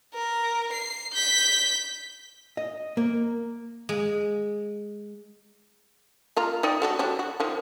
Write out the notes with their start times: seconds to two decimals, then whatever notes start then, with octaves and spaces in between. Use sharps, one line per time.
0.14 A#4
0.72 C7
1.13 G6 B6
2.57 D#5
2.97 A#3
3.89 G#3
6.37 A#3 F4 A#5
6.63 D#4 D5 G5
6.82 A3 F#4 A4
6.99 F#3 G3 D4
7.19 F#4
7.40 D#3 F3